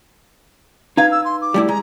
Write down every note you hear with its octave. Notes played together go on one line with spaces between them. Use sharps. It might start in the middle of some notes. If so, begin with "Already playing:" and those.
D#4 B4 F5 G#6
E6
C6
D6
G3 A3 E4
G#3 A#5